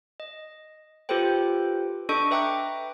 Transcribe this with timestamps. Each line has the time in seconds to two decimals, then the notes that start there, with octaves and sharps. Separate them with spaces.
0.20 D#5
1.09 F4 G4 A4 B4 C5 G5
2.09 D4 A4 D#5 C#6 D7
2.31 B4 E5 G5 A#5 D6 F#6